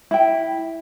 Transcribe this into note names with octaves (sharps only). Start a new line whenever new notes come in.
E4 G5